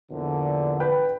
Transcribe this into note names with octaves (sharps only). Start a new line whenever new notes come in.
A#1 E2 D3
B4 G5